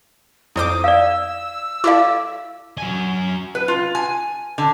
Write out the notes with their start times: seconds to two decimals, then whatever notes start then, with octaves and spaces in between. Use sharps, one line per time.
0.56 F2 E4 C5 D6 D#6
0.84 D5 F5 E6
1.84 E4 A4 D5 F5 D6
2.78 F#3 G#5
3.55 B4
3.68 F4
3.95 G#5
4.58 D3